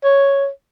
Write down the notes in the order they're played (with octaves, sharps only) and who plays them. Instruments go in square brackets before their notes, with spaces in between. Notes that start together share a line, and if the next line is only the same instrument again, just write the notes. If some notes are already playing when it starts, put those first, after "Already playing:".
[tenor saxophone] C#5